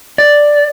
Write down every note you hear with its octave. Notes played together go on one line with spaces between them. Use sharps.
D5